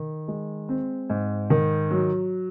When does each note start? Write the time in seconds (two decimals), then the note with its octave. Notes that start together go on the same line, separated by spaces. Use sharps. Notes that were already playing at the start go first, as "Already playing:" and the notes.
Already playing: D#3
0.28 G#3
0.69 C4
1.10 G#2
1.50 D#3
1.91 F#3